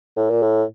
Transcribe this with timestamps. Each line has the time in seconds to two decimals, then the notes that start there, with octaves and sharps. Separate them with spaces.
0.17 A2
0.30 A#2
0.42 A2